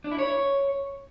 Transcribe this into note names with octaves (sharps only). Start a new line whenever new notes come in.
D4
E4
C#5